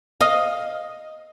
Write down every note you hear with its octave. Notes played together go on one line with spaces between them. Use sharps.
D#5 F5